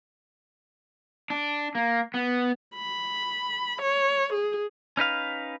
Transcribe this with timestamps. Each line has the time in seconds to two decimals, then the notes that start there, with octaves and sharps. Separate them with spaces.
1.30 D4
1.75 A#3
2.14 B3
2.76 B5
3.82 C#5
4.34 G#4
4.97 C#4 D#4 B4 F5